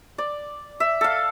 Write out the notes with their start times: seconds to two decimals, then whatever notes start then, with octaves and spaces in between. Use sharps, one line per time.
0.18 D5
0.80 E5
1.01 A4 F5